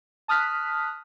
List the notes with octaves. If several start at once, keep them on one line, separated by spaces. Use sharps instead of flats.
A5 D#6 F6 F#6 B6